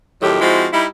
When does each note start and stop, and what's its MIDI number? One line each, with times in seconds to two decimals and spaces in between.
0.22 0.40 41
0.22 0.40 45
0.22 0.40 51
0.22 0.40 54
0.22 0.40 67
0.41 0.66 53
0.41 0.66 56
0.41 0.66 60
0.41 0.66 64
0.41 0.66 66
0.73 0.86 55
0.73 0.86 63
0.73 0.86 64